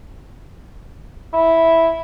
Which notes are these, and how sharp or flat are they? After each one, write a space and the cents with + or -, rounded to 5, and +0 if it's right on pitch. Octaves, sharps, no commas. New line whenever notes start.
E4 -5